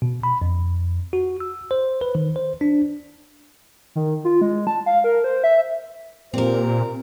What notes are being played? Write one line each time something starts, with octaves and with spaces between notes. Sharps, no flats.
B2
B5
F2
F#4
E6
C5
B4
D#3
C5
D4
D#3
F4
G#3
A5
F5
A#4
C5
E5
A#2 C4 G4 A#4 C5